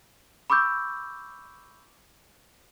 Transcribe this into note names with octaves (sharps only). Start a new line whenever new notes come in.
B5 C#6 D6 E6 G6